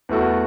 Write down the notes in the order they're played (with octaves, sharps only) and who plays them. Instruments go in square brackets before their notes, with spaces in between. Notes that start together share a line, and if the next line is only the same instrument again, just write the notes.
[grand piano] E2 E3 A3 F#4 A4